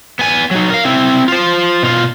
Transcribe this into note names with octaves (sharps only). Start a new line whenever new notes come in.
B3 G#5
F#3 D#4
A#4 F5
C4 E4
F4 C5
B2 F4